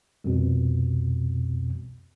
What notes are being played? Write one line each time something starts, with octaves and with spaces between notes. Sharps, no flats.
C2 F2 B2